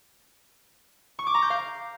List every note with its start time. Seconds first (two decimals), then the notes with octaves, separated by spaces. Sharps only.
1.19 C#6
1.27 D6
1.34 A#5
1.42 G6
1.50 F5